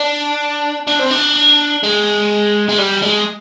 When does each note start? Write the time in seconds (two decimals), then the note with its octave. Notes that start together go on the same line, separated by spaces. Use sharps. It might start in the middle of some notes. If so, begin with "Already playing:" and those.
Already playing: D4
0.87 D4
0.99 C4
1.11 D4
1.84 G#3
2.69 G#3
2.78 G3
3.03 G#3